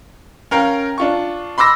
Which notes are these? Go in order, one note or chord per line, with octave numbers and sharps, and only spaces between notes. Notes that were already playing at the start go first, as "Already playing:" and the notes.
C#4 A#4 F5 G5
D4 F4 C#6
B5 C6 D6 E6 A#6